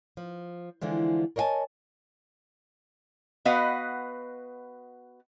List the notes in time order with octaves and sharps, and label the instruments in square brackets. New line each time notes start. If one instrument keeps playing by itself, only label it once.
[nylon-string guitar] F3
D3 E3 F3 G#3
A#4 C#5 D#5 F5 G#5 A5
[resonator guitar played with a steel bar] B3 F#4 B4 D#5 F5 F#5